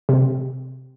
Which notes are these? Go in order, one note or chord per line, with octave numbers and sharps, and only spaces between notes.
C3